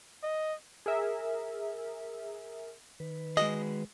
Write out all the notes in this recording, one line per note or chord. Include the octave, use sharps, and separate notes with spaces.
D#5
G#4 A#4 E5
D#3 B4
G#3 F#4 G#4 D#5